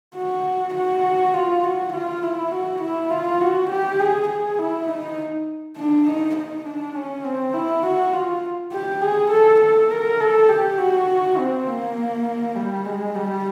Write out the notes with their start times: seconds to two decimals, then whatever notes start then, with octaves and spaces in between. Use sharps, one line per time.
0.16 F#4
0.75 F#4
1.34 F4
1.64 F#4
1.94 F4
2.23 E4
2.52 F#4
2.82 E4
3.11 F4
3.41 F#4
3.70 G4
4.00 G#4
4.29 G#4
4.59 E4
4.88 D#4
5.77 D4
6.06 D#4
6.36 D#4
6.65 D4
6.94 C#4
7.24 C4
7.53 E4
7.83 F#4
8.13 F4
8.72 G4
9.02 G#4
9.31 A4
9.61 A4
9.91 A#4
10.20 A4
10.49 G4
10.78 F#4
11.38 C4
11.67 A#3
12.56 G3
12.86 G#3
13.15 G3